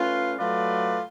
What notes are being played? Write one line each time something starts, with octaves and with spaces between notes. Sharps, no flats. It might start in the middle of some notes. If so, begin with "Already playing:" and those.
Already playing: A3 C#4 F4 B4
F#3 A3 F4 B4 D5